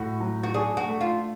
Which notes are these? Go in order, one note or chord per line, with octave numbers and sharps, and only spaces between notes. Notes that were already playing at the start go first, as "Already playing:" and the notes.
Already playing: A2 F#4
F#3
F#4
D4 G#4
F#4
A3
F4